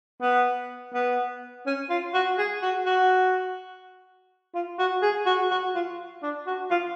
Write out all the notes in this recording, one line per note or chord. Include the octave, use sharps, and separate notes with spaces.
B3
B3
C#4
F4
F#4
G#4
F#4
F#4
F4
F#4
G#4
F#4
F#4
F4
D4
F#4
F4